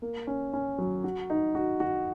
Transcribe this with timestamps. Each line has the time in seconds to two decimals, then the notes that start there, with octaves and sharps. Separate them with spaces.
0.02 A#3
0.27 C#4
0.53 C#4
0.78 F#3
1.04 F#4
1.30 D#4
1.55 F#4
1.80 F#4